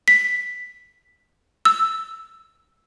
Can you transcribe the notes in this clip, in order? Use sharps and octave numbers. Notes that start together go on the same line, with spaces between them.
B6
E6